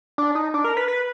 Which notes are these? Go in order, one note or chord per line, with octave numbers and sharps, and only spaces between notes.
D4
D#4
D4
A#4
B4
B4